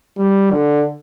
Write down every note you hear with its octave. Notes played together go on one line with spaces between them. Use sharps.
G3
D3